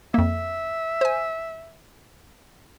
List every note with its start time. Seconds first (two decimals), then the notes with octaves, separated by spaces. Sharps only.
0.14 F2 A#3 E5
1.01 C5 G#5